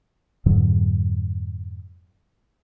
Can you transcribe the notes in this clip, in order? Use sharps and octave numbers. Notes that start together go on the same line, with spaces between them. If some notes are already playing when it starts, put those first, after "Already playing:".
F2 G#2 D3 F#3